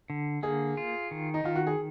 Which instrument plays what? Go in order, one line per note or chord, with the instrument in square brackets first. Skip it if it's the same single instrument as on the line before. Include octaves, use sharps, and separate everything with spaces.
[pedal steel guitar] D3
[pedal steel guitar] A#3 [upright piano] G#4
[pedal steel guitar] F4
D#3
[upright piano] D#4
[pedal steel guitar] D#3 [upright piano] F4
[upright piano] F#4
G#4